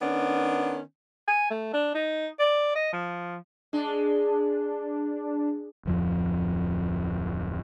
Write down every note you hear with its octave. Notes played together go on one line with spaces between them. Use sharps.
D#3 B3 C#4 D4
G#5
A3
D4
D#4
D5
D#5
F3
G#3 D4
D1 F2 F3